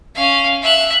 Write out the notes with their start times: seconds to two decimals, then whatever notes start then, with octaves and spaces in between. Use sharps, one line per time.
0.15 C#4 F5
0.63 E5 F#6